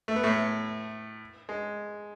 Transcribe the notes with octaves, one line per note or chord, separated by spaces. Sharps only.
A3
B3
A2 A3
G#3